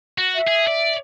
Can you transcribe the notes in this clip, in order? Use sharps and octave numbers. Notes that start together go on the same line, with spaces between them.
F#4
E5
G#4
D5